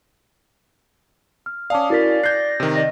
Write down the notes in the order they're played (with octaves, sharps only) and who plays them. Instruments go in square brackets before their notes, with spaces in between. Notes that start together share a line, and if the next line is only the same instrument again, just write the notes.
[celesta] F6
[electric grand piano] C#4 F5 [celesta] D5 A5 D6 [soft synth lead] D#6
[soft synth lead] E4 [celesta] F#4 A#4 B6 [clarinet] D5
[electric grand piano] F#6 G6 [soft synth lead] A#6 [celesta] C7
[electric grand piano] C3 D#3
[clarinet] D5 [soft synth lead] D#5 [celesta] A#6